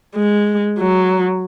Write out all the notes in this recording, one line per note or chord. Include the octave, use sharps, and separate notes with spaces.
G#3
F#3